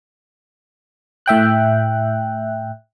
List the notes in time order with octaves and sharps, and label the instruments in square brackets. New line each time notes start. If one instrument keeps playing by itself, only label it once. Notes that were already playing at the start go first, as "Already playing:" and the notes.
[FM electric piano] A2 E5 G5 F#6